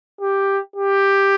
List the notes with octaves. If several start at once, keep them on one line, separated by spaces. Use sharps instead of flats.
G4
G4